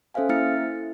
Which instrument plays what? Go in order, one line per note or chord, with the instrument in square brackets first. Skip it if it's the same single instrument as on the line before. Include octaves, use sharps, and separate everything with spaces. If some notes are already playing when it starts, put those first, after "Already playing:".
[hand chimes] C#4 A4 C5 E5 F5 G#5
A#3 E4 E5 F6 A6 C#7
E4